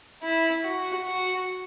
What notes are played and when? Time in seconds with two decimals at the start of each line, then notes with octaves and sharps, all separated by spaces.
0.23 E4
0.64 F#4
1.06 F#4